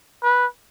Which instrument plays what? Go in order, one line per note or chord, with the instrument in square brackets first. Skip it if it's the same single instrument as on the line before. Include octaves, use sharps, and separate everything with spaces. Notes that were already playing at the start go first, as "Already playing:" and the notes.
[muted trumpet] B4